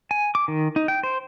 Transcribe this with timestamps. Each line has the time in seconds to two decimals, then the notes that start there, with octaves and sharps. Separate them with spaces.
0.11 G#5
0.35 D6
0.48 D#3
0.76 D#4
0.88 G5
1.03 C5